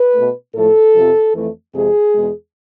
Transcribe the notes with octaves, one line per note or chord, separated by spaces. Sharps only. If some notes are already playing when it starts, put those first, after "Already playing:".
Already playing: B4
B2 A3
A2 F3 A3 A4
F2 C3 F3
F2 E3 A3
F2 C3 G#3 G#4
E2 B2 G#3